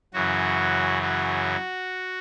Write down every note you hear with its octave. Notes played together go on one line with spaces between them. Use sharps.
F#2 C#3 E3 F#4
F#4